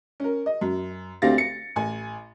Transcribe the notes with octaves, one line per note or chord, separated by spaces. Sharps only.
C#4 A#4
D#5
F#2
D2 C4 G4 F5 A6 A#6
C#7
A1 G#5